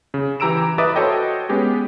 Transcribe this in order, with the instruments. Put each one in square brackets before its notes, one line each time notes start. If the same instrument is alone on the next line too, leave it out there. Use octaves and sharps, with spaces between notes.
[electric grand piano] C#3
E3 G4 A#5 E6 D7 E7
B4 D#5 E5 D6 D#6 A6
F#4 A4 C5 C#5 D#5 G5
G#3 B3 C#4 G4 G#4